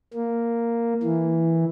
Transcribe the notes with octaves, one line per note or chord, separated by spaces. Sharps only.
A#3
E3